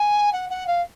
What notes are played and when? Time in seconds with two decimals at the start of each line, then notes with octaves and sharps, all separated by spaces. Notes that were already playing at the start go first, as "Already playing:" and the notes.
Already playing: G#5
0.32 F#5
0.50 F#5
0.67 F5